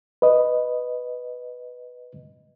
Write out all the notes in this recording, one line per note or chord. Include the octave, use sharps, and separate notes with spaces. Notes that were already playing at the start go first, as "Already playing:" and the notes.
B4 D#5